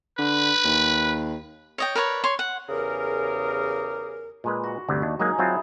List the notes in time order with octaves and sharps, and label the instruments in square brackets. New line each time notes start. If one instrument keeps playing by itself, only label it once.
[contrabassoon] D3 [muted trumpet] B4
[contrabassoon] D#2
[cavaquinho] C#5 D#5 G5
A#4 B4 C#5 D5
C#5 C6
F#5
[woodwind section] E2 C#3 G4 G#4 A#4
[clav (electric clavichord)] A#2 G#3 B4
[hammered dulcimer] F#4
[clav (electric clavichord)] G1 D2 C3
D#2 D4
[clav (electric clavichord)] F#3 G#3 A#3 [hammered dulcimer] D#4 G#4
[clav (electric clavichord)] F#3 C4 F4 [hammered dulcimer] E4